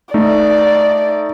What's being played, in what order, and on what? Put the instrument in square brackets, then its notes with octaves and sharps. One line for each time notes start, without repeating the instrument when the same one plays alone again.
[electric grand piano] A3 D#4 [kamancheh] D5